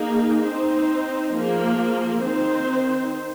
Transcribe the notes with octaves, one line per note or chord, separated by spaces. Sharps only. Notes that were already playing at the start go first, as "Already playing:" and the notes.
Already playing: A#3 D#4 G#4
C4 D#4 C5
F3 A#3 G#4
D#3 C4 D#4 C5